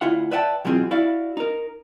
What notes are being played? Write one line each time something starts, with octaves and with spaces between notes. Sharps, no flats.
D2 E4 F4 F#5
B4 D5 E5 F#5 G5 A5
B2 E3 F#3 C4 F4 G#4
E4 F#4 D5 F5
D#4 A#4